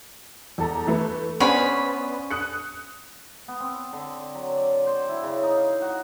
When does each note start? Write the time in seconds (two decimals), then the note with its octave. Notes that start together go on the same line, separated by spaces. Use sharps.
0.58 E2 A4 A#5
0.87 E3 A3 B4
1.40 B3 C#4 D4 C5 G#5 B5
2.31 D#6 F#6 C#7
3.48 B3
3.60 C4
3.93 D3
4.35 F#3
4.57 D5
4.87 C5
5.09 E4
5.23 C#3
5.43 D#4
5.57 F5
5.82 F#4